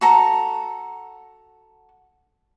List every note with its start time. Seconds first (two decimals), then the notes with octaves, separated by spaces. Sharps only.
0.01 F#4 A4 A#5